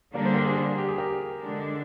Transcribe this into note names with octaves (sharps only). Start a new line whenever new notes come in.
D3 G3 A#3 D4 A#4 D5
G#4 C5
G4 A#4
G#4
G4
G#4
G4 A#4
D3 G#3 D4